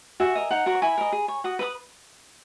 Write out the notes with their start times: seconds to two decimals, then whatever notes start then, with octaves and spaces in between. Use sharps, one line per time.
0.20 F#4 E5 G#5
0.35 A#4 D#5
0.51 D#4 F#5 A#5
0.66 F#4 A#4 C#5
0.74 C#6
0.82 E4 G#5 B5
0.98 A#4 D#5
1.12 G#4
1.28 C#5
1.44 F#4 D#6
1.59 B4 D#5 B5 D#6